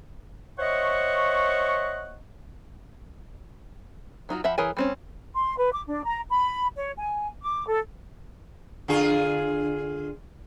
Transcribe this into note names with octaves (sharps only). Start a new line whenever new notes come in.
C5 C#5 D#5 E5 F#5 C#6
F#3 D#4 F4 F#4
F3 E5 F#5 B5
E3 G#4 A#4 C#5 G#5
G3 C4 C#4
C6
B4
D6
D4
A#5
B5
C#5
G#5
D6
A4
D3 F4 G#4